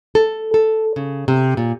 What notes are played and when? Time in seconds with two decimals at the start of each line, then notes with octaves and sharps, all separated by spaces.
0.15 A4
0.54 A4
0.96 C#3
1.28 C3
1.57 A#2